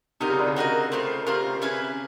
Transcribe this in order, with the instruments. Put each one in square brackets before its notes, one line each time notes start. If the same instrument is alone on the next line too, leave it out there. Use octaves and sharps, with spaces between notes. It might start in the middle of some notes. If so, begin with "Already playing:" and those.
[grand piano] C3 [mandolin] D#4 F#4 A#4 D#5
[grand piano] C#3
D3
C#3
[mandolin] D#4 F#4 A#4 D#5
A3 C4 F4 A#4
[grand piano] C3 [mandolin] A3 C4 F4 A#4
[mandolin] C#4 E4 G#4 B4